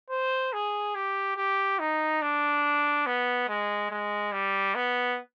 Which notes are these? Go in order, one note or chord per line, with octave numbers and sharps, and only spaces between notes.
C5
G#4
G4
G4
D#4
D4
B3
G#3
G#3
G3
B3